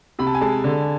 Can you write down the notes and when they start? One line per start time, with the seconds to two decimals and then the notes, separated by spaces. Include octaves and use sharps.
0.19 C3 B5
0.27 A5
0.35 G#5
0.41 G#3 A5
0.64 D3